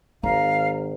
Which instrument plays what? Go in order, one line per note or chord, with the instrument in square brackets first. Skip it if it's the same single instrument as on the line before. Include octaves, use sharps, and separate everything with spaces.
[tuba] G#1 [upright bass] D#3 [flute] F5 [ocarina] A#5